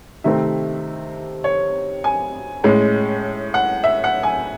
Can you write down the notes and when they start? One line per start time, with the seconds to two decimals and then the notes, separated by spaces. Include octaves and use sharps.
0.24 C3 D#3 A3 C4 E5
1.44 C#5
2.04 G#5
2.64 A2 G#3 C#4
3.54 F#5
3.84 E5
4.04 F#5
4.23 G#5